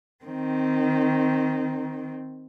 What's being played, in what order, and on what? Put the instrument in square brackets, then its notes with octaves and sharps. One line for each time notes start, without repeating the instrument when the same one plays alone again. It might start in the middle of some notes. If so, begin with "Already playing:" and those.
[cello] D#3 C4